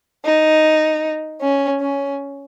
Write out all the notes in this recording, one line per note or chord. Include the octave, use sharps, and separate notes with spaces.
D#4
C#4
C#4